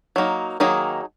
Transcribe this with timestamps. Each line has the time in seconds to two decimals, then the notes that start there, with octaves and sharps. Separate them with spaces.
0.16 F#3 A#3 D#4
0.60 D#3 F#3 A#3 D#4 G#4